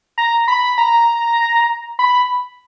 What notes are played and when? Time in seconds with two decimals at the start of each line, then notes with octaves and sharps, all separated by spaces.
0.18 A#5
0.48 B5
0.78 A#5
1.99 B5